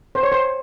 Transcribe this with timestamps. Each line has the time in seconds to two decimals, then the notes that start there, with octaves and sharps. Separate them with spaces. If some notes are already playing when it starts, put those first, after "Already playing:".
0.15 C5
0.23 C#5
0.32 C5